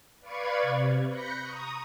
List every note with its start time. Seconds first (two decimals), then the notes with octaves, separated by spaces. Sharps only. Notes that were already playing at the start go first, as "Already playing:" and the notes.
0.20 B4 D5 F5 B5 C#6 G#6
0.62 C3
1.09 B5 F#6 G6 A#6 C#7
1.41 A#5 C#6 D#6